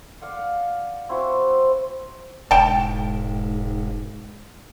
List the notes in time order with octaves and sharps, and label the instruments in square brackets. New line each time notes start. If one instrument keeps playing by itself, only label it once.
[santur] D5 F5 F#5
C4 E4 F#4 C5
[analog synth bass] E1 [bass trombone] G#2 [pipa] G5 A5